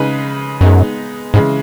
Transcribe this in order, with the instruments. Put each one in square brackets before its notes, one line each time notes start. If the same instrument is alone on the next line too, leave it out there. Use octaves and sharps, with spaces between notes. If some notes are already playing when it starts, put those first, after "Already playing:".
Already playing: [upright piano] C#3 G#3 D#4 G#4 B4
[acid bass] F#2 [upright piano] G#3 B3 D#4
[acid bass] G#2 [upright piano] C#3 E3 G#3